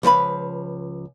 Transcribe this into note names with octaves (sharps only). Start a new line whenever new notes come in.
C#2 F3 B4 B5